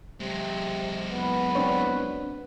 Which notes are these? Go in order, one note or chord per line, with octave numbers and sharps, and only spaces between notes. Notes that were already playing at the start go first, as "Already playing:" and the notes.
C3 F#3 G#3
F#1 B3 B4
C4 D4 C#5